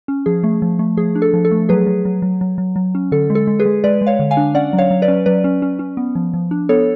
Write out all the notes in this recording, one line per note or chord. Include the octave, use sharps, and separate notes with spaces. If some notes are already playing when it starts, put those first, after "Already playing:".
C#4
F3 G#4
A3
F3
A3
F3 G#4
D4
A4
F3
A4
A3
F#3 G#4 B4
F#3
F#3
F#3
F#3
F#3
F#3
C#4
D3 A4
G#3
A4
G#3
G#4 B4
G#3
G#3 B4 D5
G#3
C#5 F5
D3
F5 G#5
D4
C#4 D5 F#5
F#3
C#5 F5
F#3
B4 D5
C#4
F#3 B4 D5
C#4
C#4
C#4
B3
F3
F3
D4
B3 A4 C#5